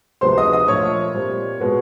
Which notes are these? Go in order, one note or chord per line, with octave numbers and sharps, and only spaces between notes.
D2 C3 F3 G#3 B3 C5 C6
D#5 D#6
D#5 D#6
A#2 F3 A3 C#5 C#6
A#2 G3 C4
B2 G#3 B3